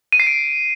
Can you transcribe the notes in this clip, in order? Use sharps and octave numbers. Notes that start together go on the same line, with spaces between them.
D#7
C7
D7